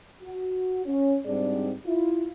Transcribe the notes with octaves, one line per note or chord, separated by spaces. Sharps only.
F#4
C#4
G#2 G3 C4 D4 G#4 D5
E4 F4